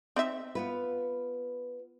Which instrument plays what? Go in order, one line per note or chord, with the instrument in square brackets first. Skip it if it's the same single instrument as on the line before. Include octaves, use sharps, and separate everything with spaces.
[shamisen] C4 D#4 E5
[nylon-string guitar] B3 F4 B4